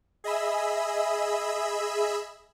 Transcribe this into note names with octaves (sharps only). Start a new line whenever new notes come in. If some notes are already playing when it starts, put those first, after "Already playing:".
G#4 D#5 E5 B5 E6